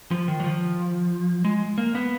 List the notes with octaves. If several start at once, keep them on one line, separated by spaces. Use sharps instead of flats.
F3
D#3
F#3
F3
G#3
A#3
B3